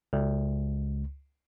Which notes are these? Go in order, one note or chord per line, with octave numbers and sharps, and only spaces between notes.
C#2